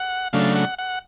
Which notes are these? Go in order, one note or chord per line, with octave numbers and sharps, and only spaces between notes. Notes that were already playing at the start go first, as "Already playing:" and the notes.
Already playing: F#5
C#3 F#3 A3 D4 F5
F#5
F#5